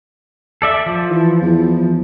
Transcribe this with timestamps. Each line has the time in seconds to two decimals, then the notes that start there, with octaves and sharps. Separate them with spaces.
0.62 A4 D5 E5
0.86 F3
1.10 E3
1.41 E2